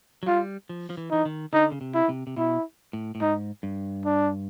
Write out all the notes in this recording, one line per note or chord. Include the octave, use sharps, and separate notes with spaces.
F#3
G3 F4
F3
F3
E3
E3 D#4
D#3
D3 D#4
C#3
C3
E4
C3
C3
B2 E4
A2
A2
G#2 D#4
G2
D4